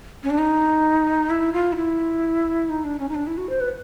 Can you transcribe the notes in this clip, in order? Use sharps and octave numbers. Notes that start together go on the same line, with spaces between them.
C#4
D4
D#4
E4
F4
D#4
E4
D#4
D4
C#4
D#4
D4
E4
F#4
C5
B4